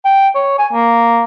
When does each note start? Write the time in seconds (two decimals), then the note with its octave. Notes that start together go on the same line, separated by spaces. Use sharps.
0.05 G5
0.35 C#5
0.58 G#5
0.73 A#3